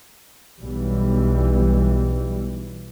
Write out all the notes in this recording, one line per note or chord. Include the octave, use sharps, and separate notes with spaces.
B1 E3 G3